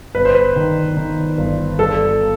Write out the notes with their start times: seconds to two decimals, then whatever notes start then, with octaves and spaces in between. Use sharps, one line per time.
0.15 G1 B4
0.25 C5
0.35 B4
0.56 D#3
0.97 D#3
1.37 G1
1.79 G2 A4